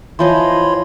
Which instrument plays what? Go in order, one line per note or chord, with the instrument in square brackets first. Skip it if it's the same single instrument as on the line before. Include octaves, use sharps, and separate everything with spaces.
[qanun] E3 F3 D#5 [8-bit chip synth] C#5 B5 C6